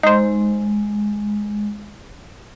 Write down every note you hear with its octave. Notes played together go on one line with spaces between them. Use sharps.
G#3 D#4 C5